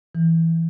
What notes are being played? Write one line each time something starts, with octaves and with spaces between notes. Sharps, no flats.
E3